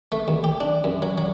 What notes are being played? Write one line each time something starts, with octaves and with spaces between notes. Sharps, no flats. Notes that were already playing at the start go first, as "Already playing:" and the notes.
A3
D#2
G4
D4
F#2
F#3
F#3